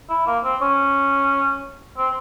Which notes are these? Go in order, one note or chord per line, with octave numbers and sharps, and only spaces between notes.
E4
A#3
C4
C#4
C4